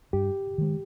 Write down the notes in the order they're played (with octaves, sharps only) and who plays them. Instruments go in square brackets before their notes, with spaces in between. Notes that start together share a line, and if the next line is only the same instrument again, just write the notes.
[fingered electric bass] G2 [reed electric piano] G4
[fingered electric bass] D#3 G#3